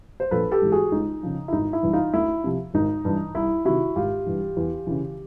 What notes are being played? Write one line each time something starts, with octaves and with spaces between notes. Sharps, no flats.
C5
A#1 A4 B4
G4 A4
G#2 E3
F#4 G#4
C#2 D#4
C#3 F3
E4
G#1 D#4
E4
G2 E3
D#4 F4
D2 E4
C3 F3
G#1 D#4
G2 E3
C2 E4
C3 D#3 E4 F#4
G#1 F4 G4
G2 E3
E2
C#3 E3